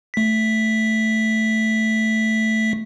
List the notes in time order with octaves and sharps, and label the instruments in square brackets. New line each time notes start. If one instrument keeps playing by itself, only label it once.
[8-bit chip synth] A3 B6